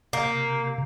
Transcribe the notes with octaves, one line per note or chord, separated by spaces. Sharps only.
C3 A#3